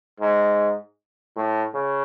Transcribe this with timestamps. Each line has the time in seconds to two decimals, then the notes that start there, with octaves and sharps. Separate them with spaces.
0.20 G#2
1.36 A2
1.75 C#3